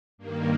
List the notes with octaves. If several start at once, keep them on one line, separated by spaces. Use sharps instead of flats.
G2 D#3 A#3